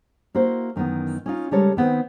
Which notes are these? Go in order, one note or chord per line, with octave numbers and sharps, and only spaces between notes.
A#3 E4 F#4 C5
F#2 D#3 E3 B3
C#4 D#4 F4
C#3 G3 G#3 A4 A#4 C#5
D#3 B3 C4 B4